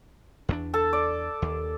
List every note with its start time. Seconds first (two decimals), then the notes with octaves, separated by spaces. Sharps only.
0.49 E2 A3 D4
0.74 A4 A5
0.93 D5
1.42 D#2